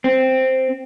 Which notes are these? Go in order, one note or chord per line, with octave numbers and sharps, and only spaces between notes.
C4